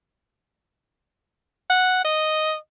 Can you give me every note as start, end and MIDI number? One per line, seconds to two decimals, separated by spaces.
1.70 2.02 78
2.04 2.55 75